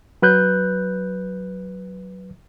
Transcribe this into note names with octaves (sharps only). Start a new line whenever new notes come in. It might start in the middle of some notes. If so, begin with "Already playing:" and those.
F#3 B4 F#6 G6